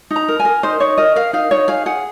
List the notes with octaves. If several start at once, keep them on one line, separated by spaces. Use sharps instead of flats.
D#4
A#5
A#4
G#5
A#4
D#4 C5
D#4 C#5
A#4 D#5
A#4 F5
D#4 F5
D#4 C#5
G#4 F5
G#4 F#5